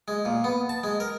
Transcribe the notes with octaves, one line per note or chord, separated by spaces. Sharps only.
G#3
A#2
B3
A5
G#3
A#4